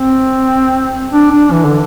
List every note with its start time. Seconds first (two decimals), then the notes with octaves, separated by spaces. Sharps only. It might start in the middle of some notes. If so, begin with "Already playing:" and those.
Already playing: C4
1.11 D4
1.31 D4
1.51 E3
1.65 D3